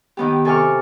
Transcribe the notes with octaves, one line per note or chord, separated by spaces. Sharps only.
D#3 B3 G4
C3 A4 G#5 C#6 D6 F6